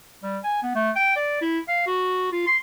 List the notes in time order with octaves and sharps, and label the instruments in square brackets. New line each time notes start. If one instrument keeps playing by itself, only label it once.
[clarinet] G3
G#5
B3
A3
G5
D5
E4
F5
F#4
F4
C6